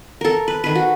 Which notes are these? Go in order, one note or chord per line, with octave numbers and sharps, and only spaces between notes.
A4 A#4
B4
D#3 B4
F#4